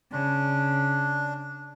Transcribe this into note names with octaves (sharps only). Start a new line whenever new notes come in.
C#3 D4